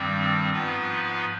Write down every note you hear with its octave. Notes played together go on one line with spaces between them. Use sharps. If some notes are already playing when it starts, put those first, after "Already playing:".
Already playing: G2 D#3 G3 C4
G#2 F3 B3 F4 B4